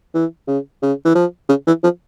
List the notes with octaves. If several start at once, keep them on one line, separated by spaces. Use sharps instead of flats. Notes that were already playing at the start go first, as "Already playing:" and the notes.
E3
C#3
C#3
E3
F3
C#3
E3
F3